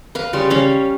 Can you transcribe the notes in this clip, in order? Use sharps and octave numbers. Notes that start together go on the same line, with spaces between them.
B4 F5
C#3 G3 C6
G3 C#4 F5